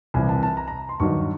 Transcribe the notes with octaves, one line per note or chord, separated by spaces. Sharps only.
C2 C3 E3 G#5
A5
A5
A#5
A#5
C6
G2 D#3 F#3 C#6